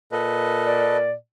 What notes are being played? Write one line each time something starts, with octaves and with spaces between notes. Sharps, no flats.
A#2 A4 B4 D#5
D5